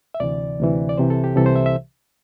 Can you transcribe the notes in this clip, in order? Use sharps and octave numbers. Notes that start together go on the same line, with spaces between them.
E5
D2 C3 E3 D5
D2 C3 E3
D5
C2 C3 E3 C5
A4
G4
C2 C3 E3 A4
C5
E5
E5